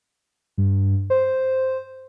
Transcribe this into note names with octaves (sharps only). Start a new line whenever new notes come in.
G2
C5